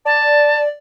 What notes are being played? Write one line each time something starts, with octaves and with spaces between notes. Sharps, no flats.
D5 A5